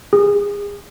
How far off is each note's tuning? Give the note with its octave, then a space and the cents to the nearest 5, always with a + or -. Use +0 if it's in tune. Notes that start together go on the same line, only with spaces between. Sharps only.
G#4 -30